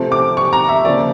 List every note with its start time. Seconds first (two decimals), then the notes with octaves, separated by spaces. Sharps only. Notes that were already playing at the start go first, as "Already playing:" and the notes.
Already playing: C3 F3 A3 C4
0.12 D6
0.37 C#6
0.53 A#5
0.69 E5
0.85 C#3 F3 A#3 D5